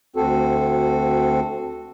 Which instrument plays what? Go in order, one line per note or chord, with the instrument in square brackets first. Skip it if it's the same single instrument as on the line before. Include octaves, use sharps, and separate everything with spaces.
[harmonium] D2 C4 F#4 A4